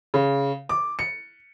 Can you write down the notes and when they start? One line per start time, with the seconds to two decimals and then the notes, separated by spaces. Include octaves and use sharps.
0.14 C#3
0.69 D6
0.99 C#7